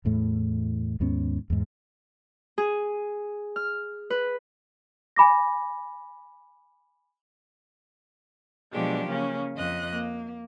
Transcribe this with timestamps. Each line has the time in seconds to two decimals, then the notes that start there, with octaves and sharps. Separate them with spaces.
0.05 E2 A2 A3
1.00 D#2 G#2 B3 C#4
1.50 E2 G#2
2.58 G#4
3.56 F6
4.10 B4
5.16 G#5 B5 D6 A#6
8.73 B2 F3 F#3 G#3 D4 G4
9.08 C#3 A#3 C#4
9.55 F2 D#5 F#6
9.91 A#3